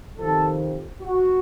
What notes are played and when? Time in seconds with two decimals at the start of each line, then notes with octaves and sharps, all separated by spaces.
0.19 F2 C3 D#3 A4
1.01 F#4